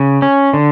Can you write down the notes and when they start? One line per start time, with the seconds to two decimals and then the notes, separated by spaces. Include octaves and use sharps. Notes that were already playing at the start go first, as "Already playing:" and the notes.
Already playing: C#3
0.22 C#4
0.53 D3